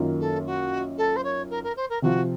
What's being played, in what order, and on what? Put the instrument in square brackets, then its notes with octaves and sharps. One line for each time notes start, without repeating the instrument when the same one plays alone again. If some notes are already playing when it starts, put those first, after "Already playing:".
Already playing: [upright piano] F#2 D#3 A#3 F4
[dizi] A4
F#4
A4
C5
C#5
A#4
A#4
C5
A#4
[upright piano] C3 F3 C4 F4 [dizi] F#4